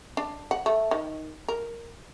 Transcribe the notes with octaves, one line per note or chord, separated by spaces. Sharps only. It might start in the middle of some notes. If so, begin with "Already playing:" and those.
D4
F#5
A3
D#3
A#4